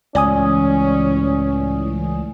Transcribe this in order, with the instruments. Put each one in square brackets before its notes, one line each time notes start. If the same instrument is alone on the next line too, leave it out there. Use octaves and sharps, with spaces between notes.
[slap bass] C#2 [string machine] A2 E3 [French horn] C#4 [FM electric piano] D5 G#5 D#6